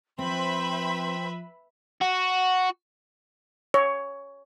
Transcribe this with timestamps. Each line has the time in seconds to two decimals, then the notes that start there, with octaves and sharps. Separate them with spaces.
0.19 F3 C4 B4 C5 E5 G5 B5 C6
2.02 F#4
3.74 C#5